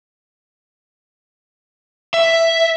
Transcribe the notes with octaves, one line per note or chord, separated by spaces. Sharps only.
E5